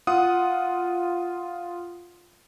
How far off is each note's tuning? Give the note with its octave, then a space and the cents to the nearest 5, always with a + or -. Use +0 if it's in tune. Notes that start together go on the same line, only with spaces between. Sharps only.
F4 +0 F#5 -5 D#6 +0